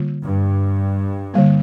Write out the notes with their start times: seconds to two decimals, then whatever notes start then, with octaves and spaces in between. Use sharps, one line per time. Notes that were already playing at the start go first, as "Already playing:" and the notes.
Already playing: D3 G3 A#3 F4
0.25 G2
1.34 D3 G3 A#3